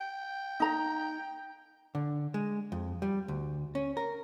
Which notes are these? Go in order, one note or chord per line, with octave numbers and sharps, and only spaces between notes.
G5
D#4 A#5
D3
G#3
F2
G3
D2
C#4
A#4